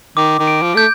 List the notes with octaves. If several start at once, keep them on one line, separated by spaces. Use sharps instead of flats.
D#3 D6
D#3
D7
F3
A3 G6